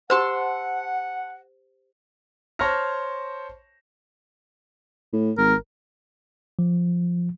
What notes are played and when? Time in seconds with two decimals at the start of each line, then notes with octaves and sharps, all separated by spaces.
0.10 G4 C5 F#5 A5 C6 E6
2.59 C5 C#5 A5 C#6 F6 A#6
5.13 A2
5.38 G#1 A#4
6.59 F3